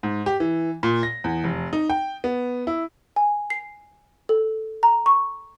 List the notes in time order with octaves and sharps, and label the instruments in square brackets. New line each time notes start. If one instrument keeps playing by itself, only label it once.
[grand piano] G#2
G4
E3
A#2
A#6
E2
F1
D#4
G5
B3
E4
[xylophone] G#5
C7
A4
A#5
C#6